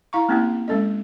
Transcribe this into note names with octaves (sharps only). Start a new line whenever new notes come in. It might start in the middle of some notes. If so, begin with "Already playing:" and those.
E4 F5 A#5 C#6
A3 A#3 C4 C#4 E4 G4
G#3 C#4 A4 D#5